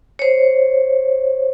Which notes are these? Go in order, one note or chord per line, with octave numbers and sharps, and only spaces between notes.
C5 C#5